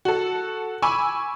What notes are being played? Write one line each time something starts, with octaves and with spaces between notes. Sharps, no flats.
F#4 A4
G#5 B5 C#6 D6 E6